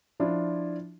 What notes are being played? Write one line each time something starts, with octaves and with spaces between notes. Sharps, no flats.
F3 D4 E4 F4